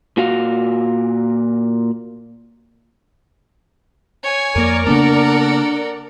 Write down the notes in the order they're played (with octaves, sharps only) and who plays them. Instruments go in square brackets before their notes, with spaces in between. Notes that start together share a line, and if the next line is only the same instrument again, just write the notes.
[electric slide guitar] A#2 F#4 F5
[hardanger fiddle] C#5 G#5
[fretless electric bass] F2 A#3 [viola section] A#4 D5
[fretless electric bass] C#3 A#3 B3 [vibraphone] D4 [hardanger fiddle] A4 F#5